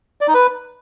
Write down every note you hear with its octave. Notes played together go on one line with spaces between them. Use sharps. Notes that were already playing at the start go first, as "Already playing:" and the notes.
D5
D#4
B4